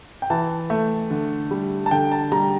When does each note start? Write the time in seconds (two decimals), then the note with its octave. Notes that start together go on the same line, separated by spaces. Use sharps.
0.22 G5
0.30 E3 A5
0.70 A3
1.11 D3
1.51 G3
1.86 A5
1.91 D3 G5
2.12 A5
2.32 G3 A#5